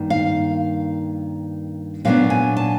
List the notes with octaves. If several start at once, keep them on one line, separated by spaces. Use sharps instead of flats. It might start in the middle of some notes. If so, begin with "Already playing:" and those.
Already playing: G2 D#3 A#3
F5
A#2 F#3 B3 D4 F5
G#5
A5